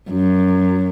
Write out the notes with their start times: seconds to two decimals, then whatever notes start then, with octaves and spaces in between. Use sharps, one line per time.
0.11 F#2